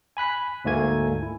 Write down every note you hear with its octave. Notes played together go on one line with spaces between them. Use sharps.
G#5 B5 F#6 B6
D2 G#2 A3 A#3 G#5 G#6
E4